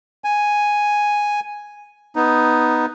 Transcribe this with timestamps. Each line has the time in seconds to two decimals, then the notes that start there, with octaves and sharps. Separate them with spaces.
0.24 G#5
2.16 B3 D#4